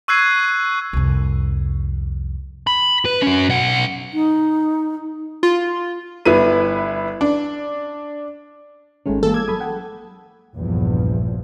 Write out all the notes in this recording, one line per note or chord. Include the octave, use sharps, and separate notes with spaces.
C#6 E6 F#6 G#6 C7 D#7
C2 F2
B5
B4
C#4 F#4
B1 F#5
D#4
F4
G1 E4 B4 D#7
D4
G#1 D#3 G#3 A3 C#4
E3 G#3 A#3 A4 A#4
D6 E6 G#6
F#3 A4 B5 D#6
F#5 G5
A#1 E2 G2 F3